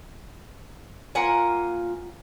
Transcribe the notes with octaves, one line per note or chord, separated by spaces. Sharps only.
A#3 F4 F#5 G#5